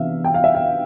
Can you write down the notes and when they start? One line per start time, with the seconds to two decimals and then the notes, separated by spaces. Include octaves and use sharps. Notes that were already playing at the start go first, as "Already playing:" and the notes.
Already playing: C3 E3 B3 D4 E5 F5
0.24 G5
0.34 F5
0.44 E5
0.55 F5